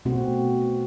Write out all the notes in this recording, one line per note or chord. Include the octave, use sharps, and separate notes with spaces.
B2 A3 C4 F#4